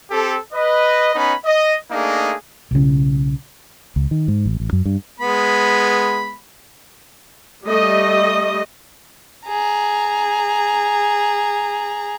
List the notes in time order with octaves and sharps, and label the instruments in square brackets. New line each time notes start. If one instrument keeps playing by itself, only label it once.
[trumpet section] C4 G4 A4
B4 D#5
B3 C#4 D#4 B5
D#5
A3 A#3 D4 D#4 G#4
[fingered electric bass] B1 C#3
C#2
D#3
G#2
A1
A1
F#2
G2
[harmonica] G#3 B3 B5
[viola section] G3 A3 D#5
[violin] G#4 A#5